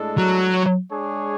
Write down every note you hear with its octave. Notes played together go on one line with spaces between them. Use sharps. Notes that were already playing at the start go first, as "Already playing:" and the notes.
Already playing: A2 G#3 D4 A4
F#3
G#3 D4 G#4 C#5